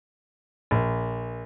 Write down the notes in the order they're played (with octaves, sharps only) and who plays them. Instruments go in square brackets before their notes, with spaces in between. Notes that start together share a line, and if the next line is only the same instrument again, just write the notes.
[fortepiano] A#1